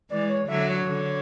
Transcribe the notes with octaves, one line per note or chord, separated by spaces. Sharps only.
E3 G#3 D5
C#5
D3 F#3 E5
C#5
D3